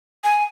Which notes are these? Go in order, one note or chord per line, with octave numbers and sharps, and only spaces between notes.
G#5